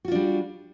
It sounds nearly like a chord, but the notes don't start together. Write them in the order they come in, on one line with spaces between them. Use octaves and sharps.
F#4 F4 D4 G3